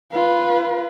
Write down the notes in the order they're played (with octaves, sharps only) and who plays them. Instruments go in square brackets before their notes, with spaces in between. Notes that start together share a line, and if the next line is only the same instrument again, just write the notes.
[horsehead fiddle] F4 B4